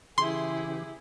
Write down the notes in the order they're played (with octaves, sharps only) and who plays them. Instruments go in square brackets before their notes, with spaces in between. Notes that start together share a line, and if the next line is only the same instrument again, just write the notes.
[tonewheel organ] C#3 E3 G4 [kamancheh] E4 G#4 [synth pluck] C6